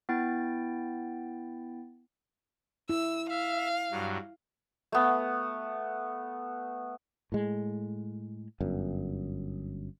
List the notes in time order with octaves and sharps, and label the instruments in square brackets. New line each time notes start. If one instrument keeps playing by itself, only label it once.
[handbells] B3 E4 G5 A6
[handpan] E4 [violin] E6
[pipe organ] E5 [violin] F5
[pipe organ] G2 F#3
[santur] A3 B3
[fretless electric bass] A2 G#3
G1 F#2